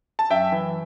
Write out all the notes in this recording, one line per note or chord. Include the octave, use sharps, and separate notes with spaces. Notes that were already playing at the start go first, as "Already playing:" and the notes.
A5
F#2 E5 G5
E3